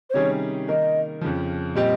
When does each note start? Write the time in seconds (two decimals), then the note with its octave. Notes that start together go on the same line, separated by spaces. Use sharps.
0.10 C5
0.14 C3 D#3 G3 C#4 G#4 C#5
0.68 D#3 A#3 D#4 A#4 D#5
1.21 F2 C#3 F3
1.75 A#2 G3 C4 G4 D#5